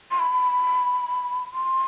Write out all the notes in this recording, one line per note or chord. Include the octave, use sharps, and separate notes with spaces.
C6
B5
C6